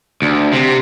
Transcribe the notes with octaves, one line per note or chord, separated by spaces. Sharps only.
D2
C3